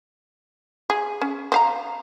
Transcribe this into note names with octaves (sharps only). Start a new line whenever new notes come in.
G#4
C#4
C4 F5 A#5